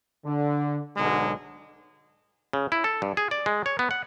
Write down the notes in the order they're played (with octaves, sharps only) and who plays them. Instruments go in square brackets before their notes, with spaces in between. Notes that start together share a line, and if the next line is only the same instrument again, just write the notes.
[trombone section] D3
B1 G#2 B2 D3 F#3 G#3
[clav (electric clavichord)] C#3
E4
A4
G2
G#4
D5
G#3
C#5
B3
F#5